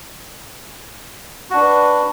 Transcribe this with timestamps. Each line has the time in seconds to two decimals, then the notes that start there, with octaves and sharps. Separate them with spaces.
1.50 F#4
1.54 D4
1.57 B4